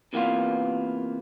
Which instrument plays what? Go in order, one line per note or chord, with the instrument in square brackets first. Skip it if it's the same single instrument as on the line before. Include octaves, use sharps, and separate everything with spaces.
[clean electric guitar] C3 E3 A#3 B3 F4